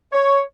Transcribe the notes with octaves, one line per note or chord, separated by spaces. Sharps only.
C#5